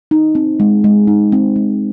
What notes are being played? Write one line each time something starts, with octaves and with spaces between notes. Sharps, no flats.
D#4
C4
G#3
G#3
D#4
C4
G#3